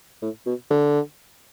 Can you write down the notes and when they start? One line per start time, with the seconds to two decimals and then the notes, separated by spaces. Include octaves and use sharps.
0.22 A2
0.46 B2
0.70 D3